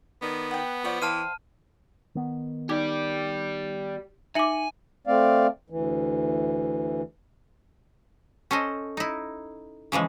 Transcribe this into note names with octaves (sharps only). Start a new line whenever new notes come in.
D#3 B3 D5
F#5 G5
F3 C#5 D5 F#5
E3 C5 F5 G5 A5 F6 D#7
D#3 B3
D#4 G4 D5 D6
D#4 E5 G#5 D6 C#7 F#7
A3 C4 D5 F5
D2 E3
C#4 A4 C5 D#5
D#4 E4
C#3 E3 F3 G#3